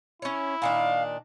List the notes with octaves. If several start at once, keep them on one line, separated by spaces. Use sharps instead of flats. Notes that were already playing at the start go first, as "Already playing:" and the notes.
C#4 E4 C#5
A#2 D#3 D4 F5